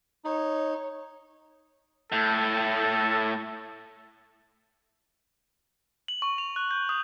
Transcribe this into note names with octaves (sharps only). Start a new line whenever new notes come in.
D#4 C#5
A2 A4
F#7
C#6
F7
F#6
G6
D#6